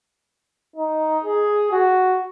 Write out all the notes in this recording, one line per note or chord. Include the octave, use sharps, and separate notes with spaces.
D#4
G#4
F#4